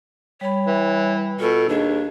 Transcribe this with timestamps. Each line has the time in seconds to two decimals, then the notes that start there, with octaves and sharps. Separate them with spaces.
0.41 G3 C#5 B5
0.67 E3
1.40 B2 F4 A4
1.69 D#2 D4 G#4 D#5